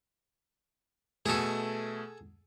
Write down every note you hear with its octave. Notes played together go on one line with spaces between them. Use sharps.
B2 A3 G#4 A4